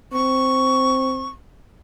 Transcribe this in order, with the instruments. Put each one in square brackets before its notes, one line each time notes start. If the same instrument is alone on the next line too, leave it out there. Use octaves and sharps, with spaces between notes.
[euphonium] C4 [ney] C#6